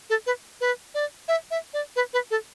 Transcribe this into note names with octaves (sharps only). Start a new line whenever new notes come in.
A4
B4
B4
D5
E5
E5
D5
B4
B4
A4